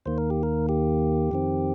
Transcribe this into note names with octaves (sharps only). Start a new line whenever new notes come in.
D#2 D#3 A#3 C5
A#4
G4
A#4
G4
F2 D#3 C4